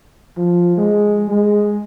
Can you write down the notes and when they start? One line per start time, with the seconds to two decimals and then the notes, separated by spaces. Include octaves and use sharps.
0.37 F3
0.77 G#3
1.29 G#3